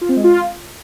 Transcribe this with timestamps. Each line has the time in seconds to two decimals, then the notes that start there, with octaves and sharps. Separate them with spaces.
0.01 F4
0.09 C4
0.17 G#3
0.24 F4